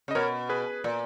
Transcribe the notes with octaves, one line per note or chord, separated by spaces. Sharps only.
C#3
D#5
B2 A#4 C#5
G#4 B4
A#2